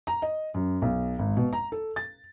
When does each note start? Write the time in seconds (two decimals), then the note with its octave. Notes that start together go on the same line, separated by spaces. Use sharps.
0.07 A#5
0.22 D#5
0.54 F#2
0.82 B1
1.19 G#1
1.37 B2
1.53 A#5
1.72 A4
1.96 A6